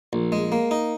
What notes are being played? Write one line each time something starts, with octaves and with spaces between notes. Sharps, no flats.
A#1
G#3
A#3
D#4